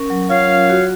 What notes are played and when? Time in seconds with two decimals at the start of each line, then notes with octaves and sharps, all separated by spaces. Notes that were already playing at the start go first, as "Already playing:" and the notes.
Already playing: C#4 A#4
0.10 F#3
0.29 F4 C#5 F5
0.49 F#3
0.70 F#4